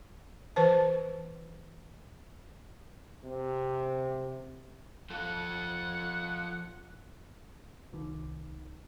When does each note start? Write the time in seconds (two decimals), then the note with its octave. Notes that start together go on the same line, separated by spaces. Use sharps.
0.56 E3 B4 C5 A5
3.24 C3
5.10 F3 F4 A4 F#5
7.93 C2 D#3